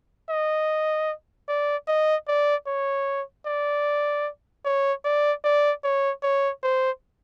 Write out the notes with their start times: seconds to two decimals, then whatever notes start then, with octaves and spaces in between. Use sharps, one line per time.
0.30 D#5
1.49 D5
1.88 D#5
2.28 D5
2.67 C#5
3.46 D5
4.65 C#5
5.05 D5
5.44 D5
5.84 C#5
6.23 C#5
6.63 C5